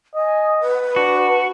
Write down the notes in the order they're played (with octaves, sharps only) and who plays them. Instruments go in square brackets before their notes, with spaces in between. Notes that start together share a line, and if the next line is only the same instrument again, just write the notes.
[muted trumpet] D#5 [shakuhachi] G#5
[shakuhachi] B4
[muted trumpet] D4 [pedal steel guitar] F#4